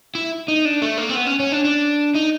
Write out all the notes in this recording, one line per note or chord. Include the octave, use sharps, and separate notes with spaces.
E4
D#4
D4
A3
A#3
C4
B3
C#4
C#4
D4
D4
D#4